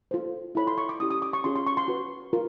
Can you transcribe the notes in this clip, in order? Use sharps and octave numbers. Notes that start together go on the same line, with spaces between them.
F4 A4 C5
E4 A4 C#5 B5
C6
C#6
D6
C#4 E4 G4 D#6
D#6
D6
C#6
C#4 F4 G#4 C6
C6
C#6
C6
F#4 B4
F4 A#4